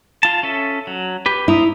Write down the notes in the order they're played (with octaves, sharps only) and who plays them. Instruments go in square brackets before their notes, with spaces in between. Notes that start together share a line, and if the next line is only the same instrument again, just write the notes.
[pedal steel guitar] F4 A5
C#4 A4 E5
F#3
G4 B4
[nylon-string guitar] E4 [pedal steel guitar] C5 A#5 D#6